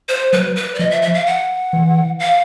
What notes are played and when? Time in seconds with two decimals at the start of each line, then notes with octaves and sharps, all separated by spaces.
0.09 C5
0.33 F#3 B4
0.56 B4
0.75 D5
0.79 F3 D#5
0.91 E5
1.02 E5
1.14 F5
1.26 F#5
1.73 E3
2.20 F5